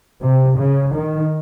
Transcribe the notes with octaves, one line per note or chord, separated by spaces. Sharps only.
C3
C#3
D#3